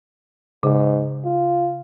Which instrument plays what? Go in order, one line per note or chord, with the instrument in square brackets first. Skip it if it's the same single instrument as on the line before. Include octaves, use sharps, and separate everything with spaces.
[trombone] G#2 [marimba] C#3
[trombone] F4